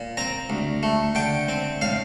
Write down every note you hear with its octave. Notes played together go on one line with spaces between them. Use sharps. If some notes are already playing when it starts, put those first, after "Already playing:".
Already playing: A#2
C4 A#5
D2
A3
D3 G5
C4
A2 F5